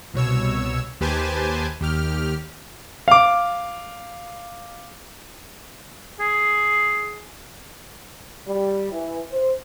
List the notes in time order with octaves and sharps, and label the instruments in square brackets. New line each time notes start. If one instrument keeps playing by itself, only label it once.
[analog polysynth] C2 B2 C#5 E6
D#2 G4 B4 C5 G#5 A5
D#2 G4 F6
[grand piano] F5 D6
[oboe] G#4
[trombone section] G3
E3
C5